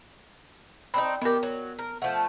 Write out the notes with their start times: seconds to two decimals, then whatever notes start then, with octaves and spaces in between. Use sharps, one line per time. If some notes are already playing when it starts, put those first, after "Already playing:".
0.94 C4 D4 D#4 B5
1.22 D#3 B3 G4 A#4
1.43 F#3
1.79 A#4
2.02 F3 A3 F#5